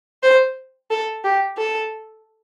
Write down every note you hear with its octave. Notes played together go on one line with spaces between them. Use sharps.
C5
A4
G4
A4